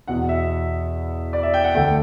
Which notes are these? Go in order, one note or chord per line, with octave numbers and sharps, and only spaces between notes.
E2 B2 F#5
E5
D5
E5
G5
F#5
D2 D3 G5